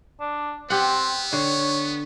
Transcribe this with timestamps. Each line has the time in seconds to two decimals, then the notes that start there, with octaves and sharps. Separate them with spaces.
0.20 D4
0.70 B3 C4 G4 F#5
1.33 D3 C#5